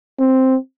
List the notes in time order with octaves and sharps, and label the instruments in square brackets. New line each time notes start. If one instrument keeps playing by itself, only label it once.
[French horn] C4